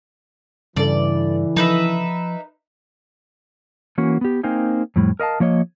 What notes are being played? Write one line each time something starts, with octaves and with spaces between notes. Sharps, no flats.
G2 C#3 E3 A4 D5
F3 D#4 B4 E5
E3 A#3 C#4 F#4
B3 G4
A#3 C4 D#4 F5 G5 G#5
F2 A2 G3
A#4 D#5 F5 A5
F3 A#3 C#5 D#5